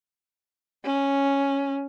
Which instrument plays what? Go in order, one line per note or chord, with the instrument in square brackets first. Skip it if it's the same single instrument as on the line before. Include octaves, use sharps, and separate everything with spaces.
[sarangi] C#4